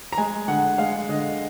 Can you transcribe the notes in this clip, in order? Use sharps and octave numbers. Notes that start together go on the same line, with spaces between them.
A#5
G#3 G#5
D3 F#5
G#3 F5
D3 D#5